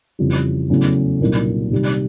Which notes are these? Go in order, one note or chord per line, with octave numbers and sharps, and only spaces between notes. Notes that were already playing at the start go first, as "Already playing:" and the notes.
F2 C#3 E3 G3
E2 C#3 F#3 A3 C#4
C2 A#2 F#3 A#3 D#4
C3 D#3 G3